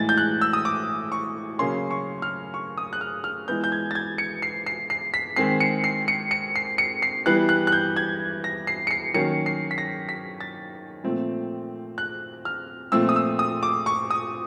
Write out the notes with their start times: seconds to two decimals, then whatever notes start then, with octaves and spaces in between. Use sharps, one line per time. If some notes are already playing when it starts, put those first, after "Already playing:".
Already playing: A2 E3 G#3 A6
0.09 G6
0.18 F#6
0.41 E6
0.53 D#6
0.65 D6
1.12 C#6
1.59 C#3 F#3 A#3 C#4 C6
1.91 C#6
2.22 F6
2.54 C#6
2.78 D#6
2.93 F#6
3.01 F6
3.24 F6
3.48 E3 G#3 B3 G6
3.64 G6
3.72 G#6
3.91 A6
3.95 G#6
4.18 C#7
4.42 C7
4.66 C7
4.90 C7
5.14 B6
5.36 D#3 G#3 C4 C7
5.60 C#7
5.84 C7
6.08 C#7
6.31 C#7
6.56 C7
6.78 C#7
7.02 C7
7.26 E3 G3 B3 F#6
7.49 F#6
7.67 F#6
7.72 G6
7.96 G#6
8.44 A#6
8.67 C7
8.87 C#7
8.91 C7
9.14 D#3 F#3 A#3 C#4 C#7
9.46 C7
9.71 B6
9.78 A#6
10.09 B6
10.41 A6
11.04 A#2 F3 A3 C4
11.98 F#6
12.45 F6
12.92 A#2 F3 A3 C4 E6
13.09 D#6
13.16 E6
13.39 D#6
13.63 D6
13.86 C#6
14.11 D#6